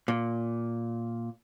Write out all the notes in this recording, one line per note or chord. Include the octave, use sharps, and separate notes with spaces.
A#2